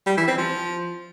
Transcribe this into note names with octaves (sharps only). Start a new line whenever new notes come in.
G3
E3
C4
F3